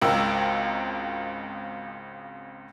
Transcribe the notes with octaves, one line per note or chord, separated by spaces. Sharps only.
G#1 C#2 A#4 G5 E6